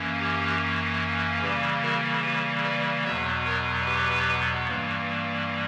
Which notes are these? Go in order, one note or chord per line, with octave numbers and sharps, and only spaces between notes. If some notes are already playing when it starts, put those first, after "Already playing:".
Already playing: F#2 E3 A#3 C#4
G4
C#3 E3 G3 A#3 G4 B4
F#4 A#4
G4 B4
B4 D5
E2 B2 F#3 B3 C#5 E5
A#4 C#5
G4 B4
G2 E3 G3 A#3